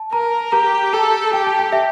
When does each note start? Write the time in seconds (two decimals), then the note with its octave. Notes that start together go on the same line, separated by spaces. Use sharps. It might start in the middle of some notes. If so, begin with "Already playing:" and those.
Already playing: A5
0.13 A#4 A#5
0.52 G4 A#5
0.93 A4 A5
1.33 G4 G5
1.46 A5
1.59 G5
1.72 E5